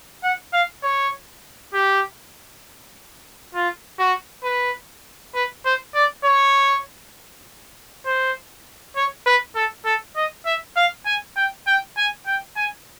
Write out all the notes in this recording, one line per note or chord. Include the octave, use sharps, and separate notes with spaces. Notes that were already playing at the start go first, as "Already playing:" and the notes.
F#5
F5
C#5
G4
F4
F#4
B4
B4
C5
D5
C#5
C5
C#5
B4
A4
A4
D#5
E5
F5
G#5
G5
G5
G#5
G5
G#5